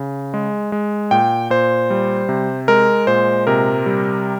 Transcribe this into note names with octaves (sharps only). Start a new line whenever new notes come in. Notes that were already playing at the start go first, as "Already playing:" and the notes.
Already playing: C#3
G#3
G#3
A#2 G5
A#2 C5
G3
C3
G#3 A#4
A#2 C5
C3 A#4
G3